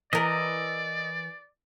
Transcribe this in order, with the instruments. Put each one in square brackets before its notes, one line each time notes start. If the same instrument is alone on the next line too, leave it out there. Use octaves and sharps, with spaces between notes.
[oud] E3 A#4 [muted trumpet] D5 [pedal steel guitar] D#5